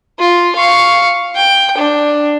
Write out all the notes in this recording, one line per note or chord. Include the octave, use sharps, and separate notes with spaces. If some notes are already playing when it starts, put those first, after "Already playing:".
F4
F5 C#6
G5
D4